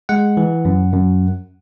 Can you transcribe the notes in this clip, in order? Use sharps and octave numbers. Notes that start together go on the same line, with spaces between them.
G#3 F#5
E3
F#2
F#2